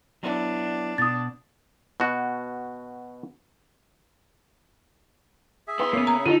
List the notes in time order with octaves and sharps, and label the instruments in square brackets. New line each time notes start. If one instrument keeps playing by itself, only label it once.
[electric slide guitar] F#3 B3 E4 [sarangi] D4
[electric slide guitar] B2 [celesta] D#6 A6
[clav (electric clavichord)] B2 F#4
[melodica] G#4 E5
[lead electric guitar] E2 C6 [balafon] B4
[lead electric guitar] C#3 [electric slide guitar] A#3 B3
[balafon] A#5
[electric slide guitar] D3 A4 [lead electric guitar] D#4 F#4 [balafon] F4